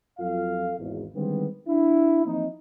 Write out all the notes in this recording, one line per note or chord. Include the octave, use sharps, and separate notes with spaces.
F2 F#3 F4 A4 F5
G#1 E2
D3 D#3 G3 G#3 B3 C4
D4 E4
E3 F3 A#3 C4 D#4